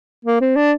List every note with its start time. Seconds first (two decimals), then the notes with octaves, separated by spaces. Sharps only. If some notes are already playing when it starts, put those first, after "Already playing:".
0.25 A#3
0.41 C4
0.56 D4